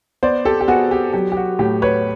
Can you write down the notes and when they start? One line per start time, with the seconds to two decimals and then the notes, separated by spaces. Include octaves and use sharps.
0.23 B3 C5 D5
0.45 G4 A4
0.61 G4
0.68 B3 F#4 G#4
0.91 G4
1.13 F#3 G4
1.32 G4
1.37 F#4
1.59 A2 G4
1.82 B4 C#5